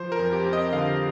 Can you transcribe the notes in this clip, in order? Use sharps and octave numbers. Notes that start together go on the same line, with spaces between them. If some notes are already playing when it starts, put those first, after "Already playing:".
Already playing: F3 C5
A#4
F2
G4
C4
D#5
D3 F5